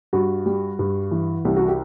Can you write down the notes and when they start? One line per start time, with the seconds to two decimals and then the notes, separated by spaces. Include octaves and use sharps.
0.13 G2 F#4
0.46 G3
0.79 G2
1.11 E3
1.45 C2 G4
1.57 F#4
1.68 G4